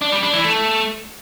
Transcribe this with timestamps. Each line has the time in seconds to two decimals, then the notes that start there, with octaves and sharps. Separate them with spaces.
0.01 D4
0.12 G3
0.23 D4
0.33 E3
0.44 A3